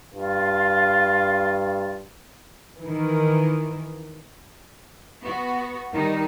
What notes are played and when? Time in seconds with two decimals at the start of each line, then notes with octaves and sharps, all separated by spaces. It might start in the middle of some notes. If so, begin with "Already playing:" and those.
0.14 G2 F4
2.80 D#3 E3
5.23 B3 F#4
5.93 D#3 G3 D#4